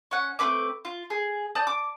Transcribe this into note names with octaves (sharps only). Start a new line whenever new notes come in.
C#4 F#5
A3 C4 B4 D6
F4
G#4
D5 A5 D#6 G6
D6